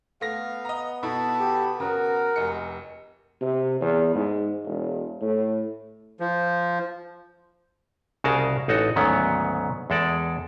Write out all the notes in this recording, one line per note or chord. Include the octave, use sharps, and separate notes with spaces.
A3 B3 F5 A#6
D#5 A#5
B2 E4 A4 A5 B5
G4
C#3 F#4 A#4
F1 G#3 C#7
C3
E2
G#2
E1
A2
F3
C2 C#3 F#4 G#4 A#4 A5
A1 D#4 F#4 A4
D2 G#2 D#3 F#3 B3 C#4
E2 G#3 A4 D5